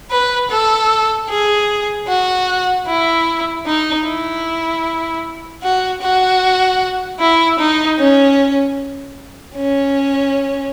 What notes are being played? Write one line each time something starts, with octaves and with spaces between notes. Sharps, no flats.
B4
A4
G#4
F#4
E4
D#4
E4
F#4
F#4
E4
D#4
C#4
C#4